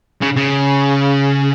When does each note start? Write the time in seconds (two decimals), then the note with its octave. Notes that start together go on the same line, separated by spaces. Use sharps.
0.21 C#3
0.36 C#3